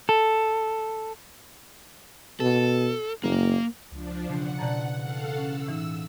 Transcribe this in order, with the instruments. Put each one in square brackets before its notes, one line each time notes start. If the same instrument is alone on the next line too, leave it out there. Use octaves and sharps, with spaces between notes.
[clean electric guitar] A4
[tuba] B2 [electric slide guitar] A4
[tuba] F#1 [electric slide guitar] A#3
[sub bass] C#2 [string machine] F3 D4
[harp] E1 C7 [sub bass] C#3 [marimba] D4 [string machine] F#5
[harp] E1 B2 A6 [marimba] D5 A5 A#5
[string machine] A4 F5 F#5
[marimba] C#4 [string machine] E6
[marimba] A2 E3 D#4